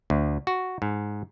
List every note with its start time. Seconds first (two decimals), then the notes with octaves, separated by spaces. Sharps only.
0.10 D2
0.47 F#4
0.82 G#2